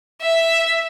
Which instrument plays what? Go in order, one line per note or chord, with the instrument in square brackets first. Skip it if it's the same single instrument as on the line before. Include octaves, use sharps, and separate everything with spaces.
[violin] E5